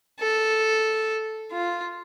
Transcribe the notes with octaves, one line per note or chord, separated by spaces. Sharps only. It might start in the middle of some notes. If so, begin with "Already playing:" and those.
A4
F4